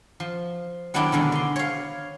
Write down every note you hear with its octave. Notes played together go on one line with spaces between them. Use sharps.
F3
D#3 F#3 B3 D4 E4 G4
B2 D3 D#3 G#3
D3 C6
C#5 F5